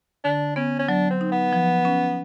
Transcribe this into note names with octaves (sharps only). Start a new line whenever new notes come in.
D3 D4
B3 C#4
C#4
F#3 D4
C4
D#4
B3
F3
C#4